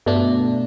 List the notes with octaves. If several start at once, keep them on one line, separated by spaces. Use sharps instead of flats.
G2 B2 A3 D4